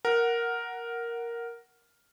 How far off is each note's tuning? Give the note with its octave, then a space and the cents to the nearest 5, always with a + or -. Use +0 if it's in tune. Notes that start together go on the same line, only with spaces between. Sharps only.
A#4 +0 F#5 +0